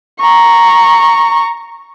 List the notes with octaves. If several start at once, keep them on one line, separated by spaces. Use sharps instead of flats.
A#5 C#6